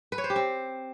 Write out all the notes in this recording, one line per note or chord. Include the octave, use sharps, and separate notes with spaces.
B4
C#5
C5
G4
C4